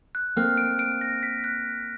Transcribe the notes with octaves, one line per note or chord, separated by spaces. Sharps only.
F#6
A#3 C4 F6
D7
D7
A#6
B6
F#6